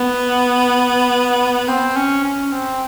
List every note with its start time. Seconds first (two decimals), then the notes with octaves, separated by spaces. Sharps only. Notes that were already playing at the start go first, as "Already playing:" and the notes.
Already playing: B3
1.68 C4
1.96 C#4
2.24 C#4
2.52 C4